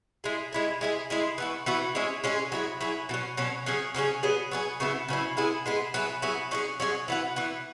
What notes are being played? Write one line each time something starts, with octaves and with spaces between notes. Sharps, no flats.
G#3 E4 G#4
G#3 E4 G#4
G#3 E4 G#4
G#3 E4 G#4
E3 B3 F#4
E3 B3 F#4
G#3 C#4 E4 G#4
G#3 C#4 E4 G#4
F#3 E4 G#4
F#3 E4 G#4
B2 F#3 C#4
B2 F#3 C#4
C#3 F#3 C#4 G#4
C#3 F#3 C#4 G#4
F#3 B3 G#4
F#3 B3 G#4
C#3 F#3 B3 E4
C#3 F#3 B3 E4
G#3 B3 E4 G#4
G#3 B3 E4 G#4
F#3 B3 E4 G#4
F#3 B3 E4 G#4
F#3 C#4 E4 G#4
F#3 C#4 E4 G#4
E3 B3 F#4
E3 B3 F#4